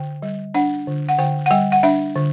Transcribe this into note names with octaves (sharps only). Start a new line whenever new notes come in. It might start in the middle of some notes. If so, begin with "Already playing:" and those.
Already playing: D3 G5
G3
D4 F#5
D3
F#5
D3 G5
F#5
G3 G5
F#5
D4 E5
D3